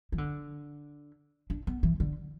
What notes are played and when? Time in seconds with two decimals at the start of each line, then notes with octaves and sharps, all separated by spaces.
0.12 E3
0.18 D3
1.50 D4
1.67 B3
1.83 E3
2.00 D3